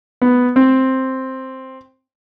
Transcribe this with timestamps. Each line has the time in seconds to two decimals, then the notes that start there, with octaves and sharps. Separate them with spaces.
0.22 B3
0.56 C4